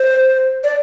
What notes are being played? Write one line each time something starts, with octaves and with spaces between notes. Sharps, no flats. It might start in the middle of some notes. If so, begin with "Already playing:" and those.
Already playing: C5
D5